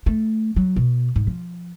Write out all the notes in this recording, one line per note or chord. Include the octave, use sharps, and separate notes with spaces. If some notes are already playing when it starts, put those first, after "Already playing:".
A3
F#3
B2
G#2
F3